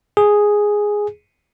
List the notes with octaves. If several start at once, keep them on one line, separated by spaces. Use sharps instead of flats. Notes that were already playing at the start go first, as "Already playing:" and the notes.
G#4